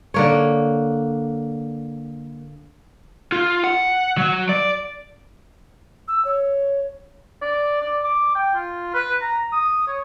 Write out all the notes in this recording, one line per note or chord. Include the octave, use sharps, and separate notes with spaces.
D3 A#3 C#5
F4
F#5
F#3
D5
E6
C#5
D5
D5
D6
G5
F4
B4
A#5
D#6
C#5